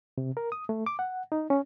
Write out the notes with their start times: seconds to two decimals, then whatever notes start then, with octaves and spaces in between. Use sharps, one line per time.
0.18 C3
0.37 A#4
0.52 D#6
0.69 A3
0.86 D6
0.99 F#5
1.32 D#4
1.50 C#4